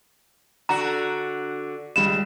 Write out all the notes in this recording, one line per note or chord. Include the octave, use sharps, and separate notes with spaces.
D3 F#4 A#5
C#2 G3 E7